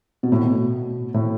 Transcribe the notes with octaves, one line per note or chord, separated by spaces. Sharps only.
B2
A2
B2
A2